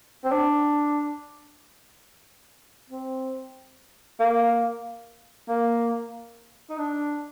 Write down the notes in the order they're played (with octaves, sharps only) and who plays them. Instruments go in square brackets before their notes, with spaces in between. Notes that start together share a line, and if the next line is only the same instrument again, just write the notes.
[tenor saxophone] C4
D4
C4
A#3
A#3
D#4
D4